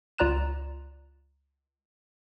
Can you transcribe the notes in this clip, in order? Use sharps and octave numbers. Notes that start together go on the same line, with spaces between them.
C#2 F4 D5 A#5 F#6 E7